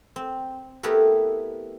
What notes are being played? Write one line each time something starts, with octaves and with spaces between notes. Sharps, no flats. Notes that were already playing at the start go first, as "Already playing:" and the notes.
C4
A3 B3 E4 G4 A#4